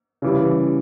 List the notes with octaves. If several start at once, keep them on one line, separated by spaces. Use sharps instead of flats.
C#3 E3 G3